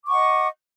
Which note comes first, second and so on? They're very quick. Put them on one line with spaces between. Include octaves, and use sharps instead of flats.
D6 C#6 F#5 D#5